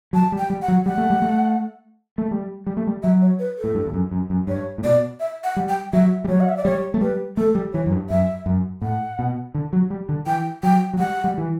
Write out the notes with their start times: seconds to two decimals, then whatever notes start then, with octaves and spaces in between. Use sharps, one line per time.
0.13 F#3 A5
0.32 G3
0.38 G5
0.50 G3
0.62 F#5
0.68 F#3
0.85 G3 F#5
0.98 A3
1.10 G3
1.22 A3
2.18 A3
2.31 G3
2.67 G3
2.77 A3
2.87 G3
3.03 F#3 E5
3.21 C#5
3.39 B4
3.58 A4
3.64 A2
3.75 G2
3.86 E2
3.93 F#2
4.11 F#2
4.30 F#2
4.47 G2 C#5
4.78 A2
4.84 B2 D5
5.20 E5
5.44 F#5
5.57 G3
5.69 G5
5.93 F#3 E5
6.24 G3
6.29 F#3 C#5
6.40 F#5
6.49 E5
6.57 D5
6.65 G3 C#5
6.94 A3
7.01 G3 B4
7.37 A3 A4
7.55 G3
7.73 E3 C#5
7.86 F#2
7.92 G2
8.10 F#2 E5
8.46 F#2
8.82 A2 F#5
9.19 B2
9.55 D3
9.73 F#3
9.90 G3
10.09 D3
10.26 E3 G5
10.63 F#3 G5
10.93 F#3
10.99 G3 F#5
11.24 G3
11.38 E3